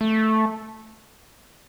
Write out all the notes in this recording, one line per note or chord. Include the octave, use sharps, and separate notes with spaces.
A3